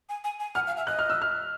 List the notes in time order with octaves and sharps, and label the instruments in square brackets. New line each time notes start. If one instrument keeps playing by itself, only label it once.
[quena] G#5
G#5
G#5
[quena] F#5 [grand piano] F6
[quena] F5
E5
[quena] D#5 [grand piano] F#6
[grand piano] F6
E6
F6